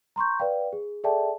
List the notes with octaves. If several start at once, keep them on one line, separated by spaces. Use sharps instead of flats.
A#5 C6 C#6 G6
B4 D5 F5 G5
G#4
G#4 A4 D5 E5 G5 A5